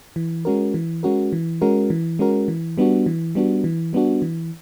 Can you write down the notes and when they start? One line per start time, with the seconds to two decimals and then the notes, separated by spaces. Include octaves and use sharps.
0.16 E3
0.45 G#3 C#4 F#4 A#4
0.74 E3
1.03 G#3 C#4 F#4 A#4
1.33 E3
1.61 G#3 C#4 F#4 A#4
1.90 E3
2.19 G#3 C#4 F#4 A#4
2.48 E3
2.78 G3 B3 D4 F#4
3.06 E3
3.35 G3 B3 D4 F#4
3.64 E3
3.93 G3 B3 D4 F#4
4.22 E3